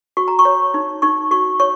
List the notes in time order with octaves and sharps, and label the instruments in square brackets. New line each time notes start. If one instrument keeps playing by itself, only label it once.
[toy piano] F#4 C#6
A#5
C#6
C#5
D#4
D#4 C#6
F#4 C#6
C#5 C#6